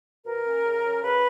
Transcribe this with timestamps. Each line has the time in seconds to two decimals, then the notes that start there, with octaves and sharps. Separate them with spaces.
0.24 B2 A#4
0.44 A#3 C#4
0.64 C#3
0.84 F#3 C#4
1.02 C#3 B4